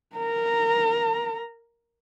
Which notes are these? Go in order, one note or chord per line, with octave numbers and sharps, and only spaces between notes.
A#4 A#5